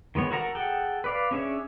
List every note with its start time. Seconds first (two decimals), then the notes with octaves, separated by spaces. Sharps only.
0.15 D#3 G#3 B3 C#5
0.31 F#4 A4 A#4 F#5 A#5
0.55 G#4 A4 F#5 G5
1.04 B4 D5 F5
1.31 C#4 D4 G#4 C#5 E5